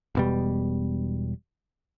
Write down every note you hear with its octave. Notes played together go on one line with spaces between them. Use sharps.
E1 B2 G3